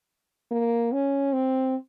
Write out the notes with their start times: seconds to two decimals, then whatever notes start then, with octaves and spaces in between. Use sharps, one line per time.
0.51 A#3
0.93 C#4
1.33 C4